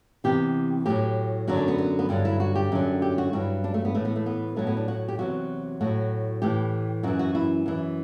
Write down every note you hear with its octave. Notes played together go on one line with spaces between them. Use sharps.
E2 C3 E3 G4
A2 F#3 G4
F#2 D3 F#3 F#4
D4
B3
B3
B3
G2 D3 F#3 D4
E4
F#4
G4
F#2 D3 F#3
G4
F#4
G2 F#3 E4
D4
A3
B3
A2 E3 A3
B3
A3
B3
A2 F#3 A3
B3
D4
F#4
G4
E2 C3 F#3 F#4
A2 F#3 F#4
A2 E3 G4
F#2 E3 F#4
F#4
E4
F#2 E3